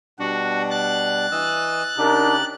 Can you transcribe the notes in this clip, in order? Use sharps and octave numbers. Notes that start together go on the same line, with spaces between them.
B2 G3 D4 F#4
F#6 A6
E3 D#5 E6
C#3 D4 D#4 G4 A#4